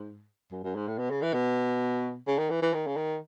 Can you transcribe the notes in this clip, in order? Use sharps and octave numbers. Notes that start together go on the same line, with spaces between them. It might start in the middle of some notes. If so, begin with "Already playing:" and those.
Already playing: G#2
F#2
F#2
G#2
A2
B2
C#3
E3
B2
C#3
D#3
E3
E3
D#3
C#3
D#3